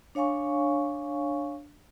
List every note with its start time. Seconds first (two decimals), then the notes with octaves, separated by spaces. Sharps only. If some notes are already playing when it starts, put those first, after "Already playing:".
0.15 D4 C#5 F5 G#5 C#6